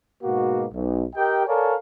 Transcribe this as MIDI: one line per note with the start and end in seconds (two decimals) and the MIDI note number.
0.23 0.66 44
0.23 0.66 47
0.23 0.66 58
0.23 0.66 66
0.73 1.04 35
1.16 1.44 67
1.16 1.44 70
1.16 1.44 75
1.16 1.44 79
1.47 1.74 69
1.47 1.74 70
1.47 1.74 73
1.47 1.74 74
1.47 1.74 77
1.47 1.74 80